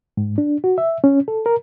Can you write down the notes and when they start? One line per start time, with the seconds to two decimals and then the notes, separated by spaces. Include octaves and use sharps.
0.17 G#2
0.38 D4
0.64 F#4
0.78 E5
1.04 C#4
1.28 A4
1.46 A#4